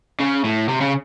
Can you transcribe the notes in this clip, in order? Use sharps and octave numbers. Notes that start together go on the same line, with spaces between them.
C#3
A2
C3
C#3